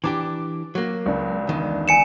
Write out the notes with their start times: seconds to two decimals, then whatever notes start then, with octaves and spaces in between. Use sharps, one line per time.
0.04 E3 D4 G4 D6
0.75 F#3 A#3
1.06 C#2 D4
1.49 E2 D#3
1.88 G#5 C#7 E7